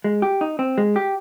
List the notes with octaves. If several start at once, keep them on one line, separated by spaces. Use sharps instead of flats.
G#3
G4
D#4
C4
G#3
G4